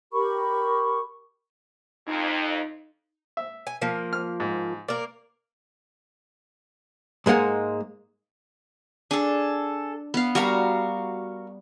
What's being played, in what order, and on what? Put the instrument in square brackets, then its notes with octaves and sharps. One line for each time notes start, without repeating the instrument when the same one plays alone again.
[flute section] G4 A#4 B5 C#6
[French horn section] F2 [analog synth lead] D#4
[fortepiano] E5
[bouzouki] G#5
F3 A#3
[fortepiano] F6
G#2
[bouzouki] A#3 A#4 [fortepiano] D5
[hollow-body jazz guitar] G#2 G#3 A#3 F#5 G#5
[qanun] D4 [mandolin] G#4 A4
[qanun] B3 F5
[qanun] G3 [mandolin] F#4 A#4 F5